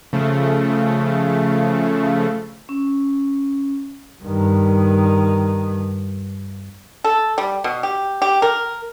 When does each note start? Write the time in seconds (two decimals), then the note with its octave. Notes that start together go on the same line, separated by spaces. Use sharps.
0.13 C#3 F3 A3
2.69 C#4
4.24 G2 D#3
7.04 A4
7.38 G3
7.64 B2
7.83 G4
8.22 G4
8.42 A#4